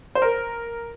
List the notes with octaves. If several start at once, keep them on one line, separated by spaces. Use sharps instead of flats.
C5
A#4